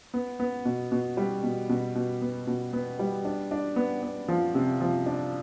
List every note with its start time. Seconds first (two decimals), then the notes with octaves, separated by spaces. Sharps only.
0.14 B3
0.40 B3
0.65 B2
0.92 B2
1.17 G3
1.43 B2
1.69 B2
1.95 B2
2.21 B3
2.47 B2
2.73 B3
2.99 G3
3.25 D4
3.51 D4
3.76 B3
4.03 B3
4.28 F3
4.55 C3
4.81 F3
5.06 D4